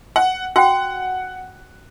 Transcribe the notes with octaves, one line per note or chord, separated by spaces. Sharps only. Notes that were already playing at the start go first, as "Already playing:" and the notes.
F#5
F#4 F#5 G5